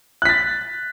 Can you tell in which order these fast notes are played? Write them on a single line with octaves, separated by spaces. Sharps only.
F#6 B6 A6